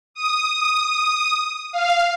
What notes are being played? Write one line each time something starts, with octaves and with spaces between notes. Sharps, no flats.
D#6
F5